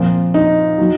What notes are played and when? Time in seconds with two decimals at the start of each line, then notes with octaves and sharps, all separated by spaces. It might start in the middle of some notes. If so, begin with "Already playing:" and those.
Already playing: A#2 F3 C4
0.34 D#4
0.78 D#3 F#3